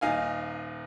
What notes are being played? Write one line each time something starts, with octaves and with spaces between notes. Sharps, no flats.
D#1 D#4 F5 G#5